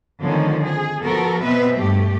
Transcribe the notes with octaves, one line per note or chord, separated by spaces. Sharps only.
D3 D#3 F3 A3 C4 C#4
G#4
F3 B3 F#4 A4 A#4
B2 B3 C4 B4 E5
G2 A3 G4